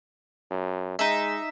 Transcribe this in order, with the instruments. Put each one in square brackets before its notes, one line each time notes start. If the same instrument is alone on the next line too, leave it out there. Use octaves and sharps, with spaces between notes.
[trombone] F#2
[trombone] G#3 [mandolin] D#4 E5